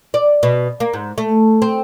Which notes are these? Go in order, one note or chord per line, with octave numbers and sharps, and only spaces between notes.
D5
B2
A#3
G#2
A3
C4